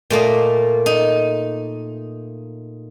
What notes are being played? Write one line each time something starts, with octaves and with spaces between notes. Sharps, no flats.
A#2 A3 A#3 D#5
D#4